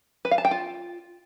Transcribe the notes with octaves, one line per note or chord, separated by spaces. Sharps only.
B4
F5
A5
G5
F4